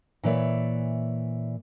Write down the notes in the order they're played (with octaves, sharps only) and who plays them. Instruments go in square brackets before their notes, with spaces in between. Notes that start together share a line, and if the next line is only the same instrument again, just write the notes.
[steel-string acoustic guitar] A#2 E3 B4 C#5 D5 E5